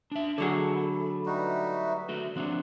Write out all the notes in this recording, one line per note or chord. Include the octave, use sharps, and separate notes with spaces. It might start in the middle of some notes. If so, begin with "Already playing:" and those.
D4 E5 A5
D3 F#3 A3 G#4 A4 F#5 A5
B5
G3 D#4 F#4 B4 E5
A3 F#4
F3 C4 D4 F#5